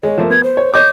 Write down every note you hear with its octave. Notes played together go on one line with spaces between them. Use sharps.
G#3 C#5
F3 A3 A#3
B3 G#6
C5
C#5
C#5 D#5 D6 G6